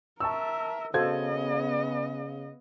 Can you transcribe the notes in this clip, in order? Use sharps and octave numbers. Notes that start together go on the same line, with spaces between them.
A#4 E5 A5 C#6 E6
C#3 B3 F#4 A4 C5 D#5 F5 G#6